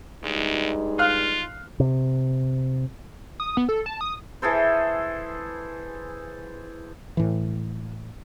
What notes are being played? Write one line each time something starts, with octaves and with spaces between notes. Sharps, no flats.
D2 G2 G#3 D#4
F4 F5 F6 F#6
C3
D#6
B3
A4
A5
D#6
E3 G#4 A4 C5
A2 E3